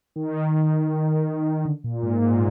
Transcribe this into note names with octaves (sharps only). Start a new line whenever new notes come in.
D#3
D3
A#2
G#2
G#2
A#2